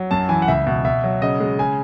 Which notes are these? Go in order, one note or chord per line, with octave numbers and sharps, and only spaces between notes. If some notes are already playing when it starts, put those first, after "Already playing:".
Already playing: F#3
F#2 A5
E3 G#5
F#5
C#2 E5
B2
B2 E5
F#3
C#3 D#5
G#3
C#3 G#5